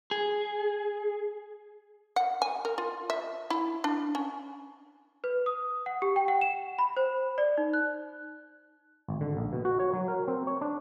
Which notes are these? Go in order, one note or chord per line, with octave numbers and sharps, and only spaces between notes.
G#4
F#5
G#5
A#4
F4
E5
E4
D4
C#4
B4
D#6
F#5
G4
G5
F#5
E7
B5
C5
D5
D#4
F#6
G#1
D3
A#1
B2
F#4
C#5
F#3
A#4
C4
C#5
D4